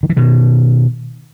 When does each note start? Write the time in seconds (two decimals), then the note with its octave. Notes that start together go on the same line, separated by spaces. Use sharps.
0.03 D#3
0.10 E3
0.17 B2 D#3